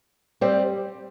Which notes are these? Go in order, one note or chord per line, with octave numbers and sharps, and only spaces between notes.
G3 C4 G4